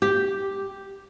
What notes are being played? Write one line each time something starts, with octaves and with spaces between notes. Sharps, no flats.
G4